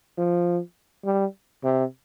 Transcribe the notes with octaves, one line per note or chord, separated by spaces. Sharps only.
F3
G3
C3